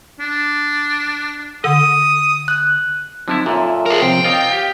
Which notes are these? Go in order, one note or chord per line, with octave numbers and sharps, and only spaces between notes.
D4
D3 D#6
F#6
D3 F3 F#3 C4 D#4 E4
F#2 A#2 F4 A4 E5
G#4 A#4
C3 F3 C4 C5 G5
F4 A#4 C#5 D#5 F5
G4